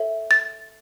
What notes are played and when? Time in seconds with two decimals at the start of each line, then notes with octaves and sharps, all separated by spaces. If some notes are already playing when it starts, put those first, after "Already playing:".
Already playing: A4 C#5 E5
0.31 A6